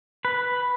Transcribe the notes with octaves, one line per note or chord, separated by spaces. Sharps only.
B4